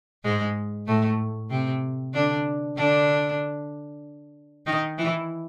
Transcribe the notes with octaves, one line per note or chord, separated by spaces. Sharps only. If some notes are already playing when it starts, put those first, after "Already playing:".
G#2 G#3
A2 A3
C3 C4
D3 D4
D3 D4
D#3 D#4
E3 E4